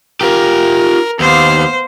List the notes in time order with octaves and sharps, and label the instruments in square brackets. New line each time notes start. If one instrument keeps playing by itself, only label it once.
[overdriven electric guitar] F4 G4 [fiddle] A#4
[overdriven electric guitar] D#2 [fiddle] B3 F5 [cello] C5